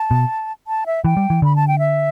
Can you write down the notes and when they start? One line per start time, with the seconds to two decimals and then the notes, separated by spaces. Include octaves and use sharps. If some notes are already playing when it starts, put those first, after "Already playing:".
Already playing: A5
0.11 B2
0.67 A5
0.86 E5
1.04 E3 G5
1.17 G3
1.30 E3
1.42 D3 B5
1.56 A5
1.68 G5
1.79 E5